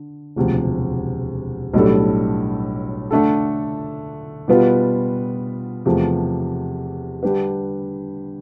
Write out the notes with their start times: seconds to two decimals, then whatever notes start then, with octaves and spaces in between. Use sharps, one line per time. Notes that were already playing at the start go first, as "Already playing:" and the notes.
Already playing: D3
0.36 E1 D2 C3 F3
1.74 B1 A2 G3 D4 A4
3.11 D3 A3 D4 A4
4.48 B2 G3 B3 F4 B4
5.85 E2 C3 F3 A3
7.23 D3 G3 D4 G4 B4